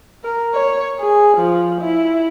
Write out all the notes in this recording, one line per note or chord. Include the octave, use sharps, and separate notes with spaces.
A#4
C#5
G#4
F3
E4